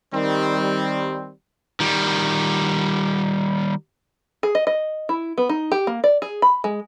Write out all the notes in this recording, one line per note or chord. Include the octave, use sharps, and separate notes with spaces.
D#3 G3 C4
D#3 G3
G#4
D#5
D#5
E4
B3
D#4
G4
A#3
D5
G#4
B5
G#3